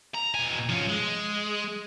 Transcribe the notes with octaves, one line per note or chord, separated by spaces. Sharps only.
A#5
B2 G#5
F3 C#4
G#3